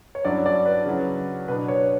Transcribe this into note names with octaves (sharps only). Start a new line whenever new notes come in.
C#5
G2 F#3 C#4 E4 D5
D5
B4
C#3 F#3 C#4 E4
B2 F#3 B3 D4 B4
C#5